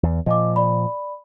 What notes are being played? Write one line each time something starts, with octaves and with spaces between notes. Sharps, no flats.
E2
A#2 F3 D#5 D6
D5 B5